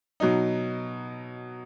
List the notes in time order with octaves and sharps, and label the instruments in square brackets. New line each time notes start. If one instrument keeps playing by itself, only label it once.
[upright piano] B2 F#3 D#4